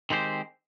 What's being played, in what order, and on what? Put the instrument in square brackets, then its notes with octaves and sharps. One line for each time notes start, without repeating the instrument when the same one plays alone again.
[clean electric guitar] D#3 G#3 C4 G4 C5